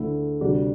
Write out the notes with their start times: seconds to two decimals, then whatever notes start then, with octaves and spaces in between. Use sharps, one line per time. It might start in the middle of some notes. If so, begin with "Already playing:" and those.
Already playing: D2 D3 A3 E4
0.41 D2 C3 G3 D4 F#4